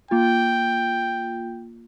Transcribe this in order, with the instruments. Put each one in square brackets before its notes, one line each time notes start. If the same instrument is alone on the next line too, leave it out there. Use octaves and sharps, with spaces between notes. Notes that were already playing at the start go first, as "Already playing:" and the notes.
[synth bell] A#3 F4 [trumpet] G5